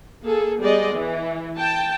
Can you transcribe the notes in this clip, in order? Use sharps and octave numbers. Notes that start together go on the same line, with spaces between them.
A#3 G#4 A4
G3 G#3 B3 G#4 D5 D#5
E3
G5 A5